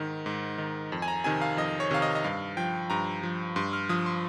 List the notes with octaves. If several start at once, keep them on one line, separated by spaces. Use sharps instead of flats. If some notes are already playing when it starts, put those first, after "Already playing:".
Already playing: G#2 D#3
G#2
D#3
F2
G#5
A#5
C3 D#3 G#5
F5
F2 D#5
C#5
C3 D#3 F5
D#5
D#5
G2 F5
F3 G5
G2 A#5
F3
G2 C6
F6
F3 D#6
C6